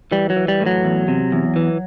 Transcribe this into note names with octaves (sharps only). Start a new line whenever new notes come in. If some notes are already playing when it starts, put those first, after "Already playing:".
E3 G3
F#3
E3
G3
A2
F#3
E2
C3
E2
E3